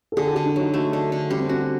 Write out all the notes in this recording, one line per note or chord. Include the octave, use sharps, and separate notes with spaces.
A4
D3 G#4
G4
D3 F#4
D4
F#3 D#4
A3
D3
D3
G3 C#4
C4
C#4 F#4